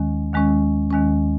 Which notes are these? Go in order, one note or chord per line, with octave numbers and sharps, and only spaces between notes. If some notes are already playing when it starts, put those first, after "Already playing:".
Already playing: D#2 D#3 G#3 C#4
D#2 D#3 G#3 C#4
D#2 D#3 G#3 C#4